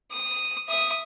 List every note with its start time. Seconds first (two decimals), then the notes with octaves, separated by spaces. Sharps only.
0.12 D#6
0.69 E5 D#6